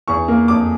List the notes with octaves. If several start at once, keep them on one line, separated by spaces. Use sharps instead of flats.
E2 C#6
A#3
F2 D6